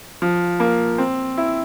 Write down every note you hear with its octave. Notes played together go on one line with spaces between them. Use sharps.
F3
A#3
C4
E4